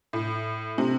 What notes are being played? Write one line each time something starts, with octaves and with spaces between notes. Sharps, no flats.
A2
C3